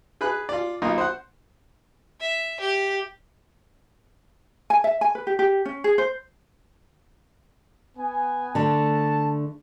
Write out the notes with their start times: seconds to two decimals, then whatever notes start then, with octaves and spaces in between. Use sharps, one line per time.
0.21 G#4 B4 B5 F#6
0.49 F4 D5
0.82 B1 A#3 D#4 F4 D#5
0.98 C5 F#5
2.21 E5
2.60 G4
4.70 G#5
4.84 E5
5.01 G#5
5.15 B4
5.27 G4
5.39 G4
5.65 C#4
5.84 G#4
5.98 C5
7.97 B3 G#5
8.55 D3 A3 A5